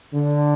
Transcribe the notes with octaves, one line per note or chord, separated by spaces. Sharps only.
D3